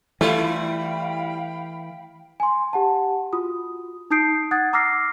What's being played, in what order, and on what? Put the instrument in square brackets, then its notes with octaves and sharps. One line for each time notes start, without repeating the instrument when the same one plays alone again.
[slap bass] E3 [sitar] G3 E4 F4 [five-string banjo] A3 [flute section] F5 G5 B5
[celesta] G#5 C6
G4 F#5 A5
F4 F#4 D#6
D#4 A5 D#6 G6 C7 D7
F#5 D#6 F#6 G#6 A6
A#5 D6 E6 F6 A#6 C7